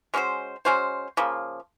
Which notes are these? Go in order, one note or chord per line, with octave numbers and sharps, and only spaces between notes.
G#3 C#4 F#4 C5
G#3 C#4 F#4 C5
C#3 F3 A#3